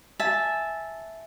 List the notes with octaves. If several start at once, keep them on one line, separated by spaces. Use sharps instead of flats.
E5 G#5 A5